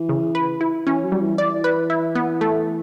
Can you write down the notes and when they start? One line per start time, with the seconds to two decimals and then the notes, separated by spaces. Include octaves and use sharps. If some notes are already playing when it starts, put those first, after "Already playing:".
Already playing: E3
0.09 C#3
0.35 B4
0.61 E4
0.86 E3 C#4
1.04 F#3
1.12 G3
1.21 E3
1.38 E3 D5
1.64 B4
1.90 E4
2.15 B3
2.41 A3